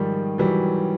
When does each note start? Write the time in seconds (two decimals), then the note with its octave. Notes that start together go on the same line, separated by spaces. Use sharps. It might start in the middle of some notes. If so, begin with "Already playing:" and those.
Already playing: G#2 D#3 F3 G3
0.38 E3 F#3 G3